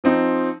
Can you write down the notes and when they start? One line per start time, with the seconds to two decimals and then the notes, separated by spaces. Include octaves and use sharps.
0.04 F3 C4 D#4